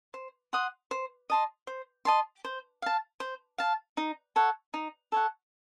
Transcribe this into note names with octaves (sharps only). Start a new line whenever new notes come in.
C5
F#5 C6 D#6
C5
D#5 A5 C6
C5
D#5 A5 C6
C5
F5 A5
C5
F5 A5
D#4
A4 C#5 F#5
D#4
A4 C#5 F#5